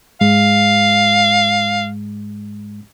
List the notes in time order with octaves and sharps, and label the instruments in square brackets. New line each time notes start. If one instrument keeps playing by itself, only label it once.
[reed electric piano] G#2 G#3 [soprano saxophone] F5